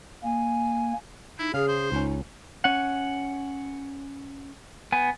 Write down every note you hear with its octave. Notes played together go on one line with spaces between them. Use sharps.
A#3 G#5
D#4 E4
C#3 G#4 F5
C5
C#2 C#4 D#4
C#4 F#5
B3 G#5